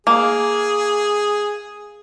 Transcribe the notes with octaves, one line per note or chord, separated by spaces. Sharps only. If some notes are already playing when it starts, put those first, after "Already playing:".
A#3 G#4